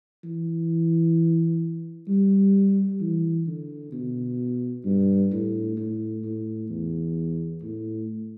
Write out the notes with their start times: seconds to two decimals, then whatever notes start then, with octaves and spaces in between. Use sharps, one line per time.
0.24 E3
2.08 G3
3.01 E3
3.48 D3
3.92 B2
4.85 G2
5.32 A2
5.77 A2
6.24 A2
6.69 E2
7.62 A2